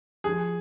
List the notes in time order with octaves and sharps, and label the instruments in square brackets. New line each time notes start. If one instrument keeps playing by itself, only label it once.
[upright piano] F3 G#4